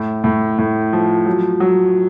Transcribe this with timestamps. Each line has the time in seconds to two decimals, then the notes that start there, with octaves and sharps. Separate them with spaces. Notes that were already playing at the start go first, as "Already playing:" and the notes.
Already playing: A2
0.24 A2
0.58 A2
0.93 F3
1.26 F#3
1.60 F#3